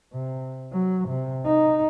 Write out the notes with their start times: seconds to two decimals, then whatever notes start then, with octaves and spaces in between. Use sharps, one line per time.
0.13 C3
0.72 F#3
1.09 C3
1.45 D#4